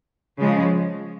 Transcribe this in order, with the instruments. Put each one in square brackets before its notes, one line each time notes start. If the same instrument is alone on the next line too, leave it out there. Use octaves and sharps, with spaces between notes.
[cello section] C#3 F3 G#3